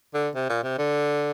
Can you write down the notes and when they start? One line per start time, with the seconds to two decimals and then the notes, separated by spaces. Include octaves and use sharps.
0.14 D3
0.35 C3
0.49 A#2
0.63 C3
0.78 D3